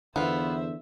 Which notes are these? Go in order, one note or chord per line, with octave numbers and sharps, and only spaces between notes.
E2 D3 B3 F4 C5 E5